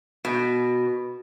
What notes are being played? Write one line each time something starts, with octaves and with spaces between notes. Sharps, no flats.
B2